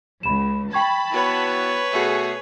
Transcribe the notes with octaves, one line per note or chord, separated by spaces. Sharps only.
C#2 B5 E7
G5 A5 B5 C#6 G#6
B3 E4 F#4 B4 C#5
B2 A3 F#4 G#4